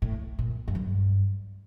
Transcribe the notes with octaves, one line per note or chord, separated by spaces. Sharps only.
A2
A#2
F#2
G2